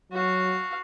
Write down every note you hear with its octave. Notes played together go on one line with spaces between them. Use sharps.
F#3 F#4 F5